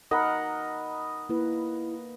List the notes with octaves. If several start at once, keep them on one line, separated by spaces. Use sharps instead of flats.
D#4 A#4 D#5 F#5 B5
A#3 E4 B4